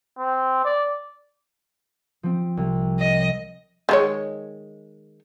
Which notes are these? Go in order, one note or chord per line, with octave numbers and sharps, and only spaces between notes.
C4
D5
F3 C4
C2
D#5
D#3 G#3 C#5